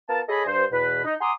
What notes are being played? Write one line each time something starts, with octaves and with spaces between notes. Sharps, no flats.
B3 F4 A#4 A5
G#4 A4 C#5 D#5 G#5 B5
G2 C5
E2 B2 B4
D#4
F#5 G#5 A#5 C6 D6 D#6